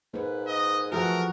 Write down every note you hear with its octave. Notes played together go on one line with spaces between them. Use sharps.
G#2 A#3 B4
D#5
E3 F3 A3 F#4 G#4 A#4 F#5